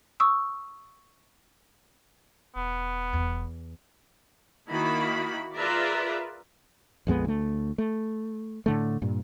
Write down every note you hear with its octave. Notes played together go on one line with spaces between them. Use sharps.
C#6 D#6 E6
E1 B3
E2
D#3 A#3 E4 F#4 B5
F4 G#4 A#4 B4 D5 E5
A#1 F2 G#3 B3
D2 A3
A3
A2 D3 A3
G2 A#2